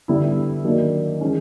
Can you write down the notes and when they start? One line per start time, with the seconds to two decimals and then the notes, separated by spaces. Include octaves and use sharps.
0.08 D3 G3 B3 E4
0.64 D#3 F#3 A#3 D4
1.21 E3 G#3 C#4